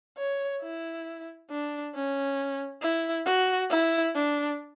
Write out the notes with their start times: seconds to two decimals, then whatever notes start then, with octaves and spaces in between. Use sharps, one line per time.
0.18 C#5
0.62 E4
1.50 D4
1.95 C#4
2.82 E4
3.26 F#4
3.70 E4
4.15 D4